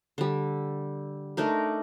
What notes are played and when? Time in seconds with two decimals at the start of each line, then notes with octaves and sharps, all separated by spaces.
0.18 D3 G3
1.37 A3 D4 D#4 A#4